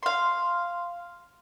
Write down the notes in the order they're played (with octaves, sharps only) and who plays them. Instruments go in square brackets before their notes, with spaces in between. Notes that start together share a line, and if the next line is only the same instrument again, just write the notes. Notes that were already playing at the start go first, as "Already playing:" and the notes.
[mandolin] F5 C6